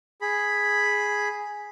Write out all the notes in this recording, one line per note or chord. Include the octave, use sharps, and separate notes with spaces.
G#4 B5